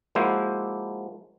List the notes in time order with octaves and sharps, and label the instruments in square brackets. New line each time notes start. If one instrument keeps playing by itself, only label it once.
[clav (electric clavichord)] F3 G#3 A#3 E4 F#4 C5